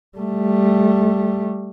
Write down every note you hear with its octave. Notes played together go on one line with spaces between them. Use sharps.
G3 A3